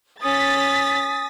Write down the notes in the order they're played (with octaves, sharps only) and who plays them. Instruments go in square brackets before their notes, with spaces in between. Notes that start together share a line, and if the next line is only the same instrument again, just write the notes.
[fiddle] C#4 [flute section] G#5 D#6 [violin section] A6 B6